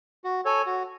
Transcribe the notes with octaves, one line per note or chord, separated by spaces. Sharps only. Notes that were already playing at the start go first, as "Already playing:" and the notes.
F#4
A4 C#5 G#5
F#4